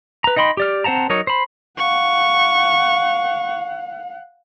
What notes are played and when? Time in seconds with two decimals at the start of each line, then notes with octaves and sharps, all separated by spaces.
0.24 B4 A#5
0.36 D#4 D#5 G5 B5 C6
0.57 G4 D5 F6
0.84 C4 C5 F#5 A5 A#5
1.10 F#3 D#4 A#4 C#5
1.27 C5 B5
1.78 F5 F#5 C#6